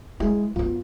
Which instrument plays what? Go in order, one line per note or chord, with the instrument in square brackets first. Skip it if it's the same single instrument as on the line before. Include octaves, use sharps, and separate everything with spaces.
[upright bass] G#3 [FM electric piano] E4 G#4
[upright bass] F#2 B3 [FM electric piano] F4